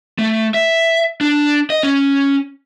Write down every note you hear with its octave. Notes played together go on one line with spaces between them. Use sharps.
A3
E5
D4
D#5
C#4